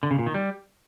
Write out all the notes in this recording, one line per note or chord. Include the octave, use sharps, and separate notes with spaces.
D3
C#3
A#2
D#3
G3